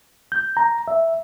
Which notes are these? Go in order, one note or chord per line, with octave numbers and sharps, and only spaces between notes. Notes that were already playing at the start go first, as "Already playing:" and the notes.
G6
A#5
E5